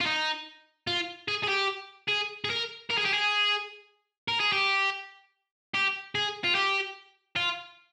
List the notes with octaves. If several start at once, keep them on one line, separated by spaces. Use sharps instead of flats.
F4
D#4
F4
G#4
G#4
G4
G#4
G#4
A#4
A#4
G#4
G4
G#4
A#4
G#4
G4
G4
G#4
F4
G4
F4